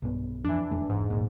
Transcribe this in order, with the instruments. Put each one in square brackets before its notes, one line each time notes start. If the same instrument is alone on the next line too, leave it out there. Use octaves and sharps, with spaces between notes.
[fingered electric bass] B1 G2 B3
[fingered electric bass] F2 [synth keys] E3 D4
[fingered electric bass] D#1 F2 A3
[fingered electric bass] E1 [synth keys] G#2
[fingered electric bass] D1 G#1 A#2